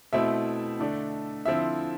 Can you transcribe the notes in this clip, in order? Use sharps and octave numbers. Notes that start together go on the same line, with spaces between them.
B2 A3 C4 E4 E5
D3 A3 D4
D3 F3 C4 E4 E5